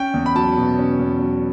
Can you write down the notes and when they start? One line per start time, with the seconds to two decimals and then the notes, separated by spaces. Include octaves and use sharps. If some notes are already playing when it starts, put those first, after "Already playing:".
Already playing: C#4 G5
0.14 E2
0.26 B5
0.35 F#3 A5
0.57 B2
0.78 C#4
0.99 E2
1.21 F#3